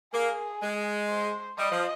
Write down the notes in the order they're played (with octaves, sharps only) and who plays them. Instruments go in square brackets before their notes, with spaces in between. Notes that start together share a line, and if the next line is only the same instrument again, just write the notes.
[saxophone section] A#3 [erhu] G#4
[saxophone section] G#3
[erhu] C5
[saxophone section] G3 [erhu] D#5
[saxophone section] F3